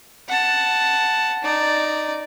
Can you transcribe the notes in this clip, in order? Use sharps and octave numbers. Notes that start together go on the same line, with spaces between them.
F#5 A5
D#4 D5